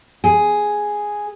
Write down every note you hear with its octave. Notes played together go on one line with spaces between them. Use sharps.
G#4